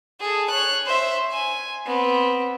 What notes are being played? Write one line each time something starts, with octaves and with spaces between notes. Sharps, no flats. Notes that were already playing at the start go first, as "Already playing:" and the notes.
G#4 A4
C#5 F#6
C5 E5
G#5
B3 C4